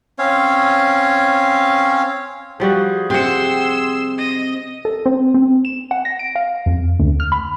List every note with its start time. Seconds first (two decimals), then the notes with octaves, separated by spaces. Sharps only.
0.19 C4 C#4 C#5 F5
2.60 F3 G3 F#4 G#4
3.10 C3 C4 F#5 C6 E6
4.18 D#5
4.85 A4
5.06 C4
5.34 C4
5.65 E7
5.91 F#5
6.05 A#6
6.19 D7
6.35 F5
6.66 F2
6.99 D2
7.20 F6
7.32 B5